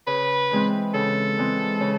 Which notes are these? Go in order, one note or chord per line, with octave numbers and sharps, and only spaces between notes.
C#3 B4
E3 G#3 C4
C#3 A4
E3 G#3 C4
C#3